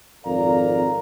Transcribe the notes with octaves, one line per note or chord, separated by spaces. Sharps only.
G#1 F2 A#4 D5 F5 A#5